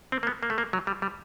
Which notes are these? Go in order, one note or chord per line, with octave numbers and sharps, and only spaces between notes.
C4
A#3
B3
A#3
A3
A#3
F#3
G3
G3